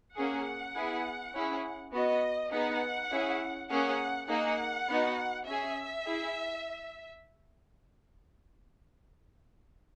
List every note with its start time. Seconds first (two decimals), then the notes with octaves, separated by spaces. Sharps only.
0.16 A#3 C#4 G#4 F#5
0.75 B3 E4 G#4
1.34 C#4 E4 G#4
1.93 B3 F#4 D#5
2.52 B3 D#4 G#4 F#5
3.11 C#4 E4 G#4
3.70 A#3 C#4 G#4 F#5
4.29 A#3 D#4 G#4 F#5
4.88 B3 D#4 F#4
5.47 C#4 G#4 E5
6.05 E4 G#4